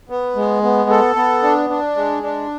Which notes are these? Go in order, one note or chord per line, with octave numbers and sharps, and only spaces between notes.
B3
G#3
B3
A4
B3
D4
D4
G#3
D4